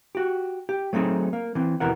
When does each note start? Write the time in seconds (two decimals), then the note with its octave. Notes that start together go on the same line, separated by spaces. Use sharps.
0.15 F#4 G4
0.69 G4
0.93 F#3 A3 C4 D#4 G#4
1.33 A#3
1.55 E3 C4
1.80 D#2 B2 E3 A#4 F#5